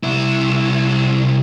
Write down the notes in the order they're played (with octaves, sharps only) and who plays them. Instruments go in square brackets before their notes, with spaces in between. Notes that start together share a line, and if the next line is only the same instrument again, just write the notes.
[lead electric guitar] C2 E4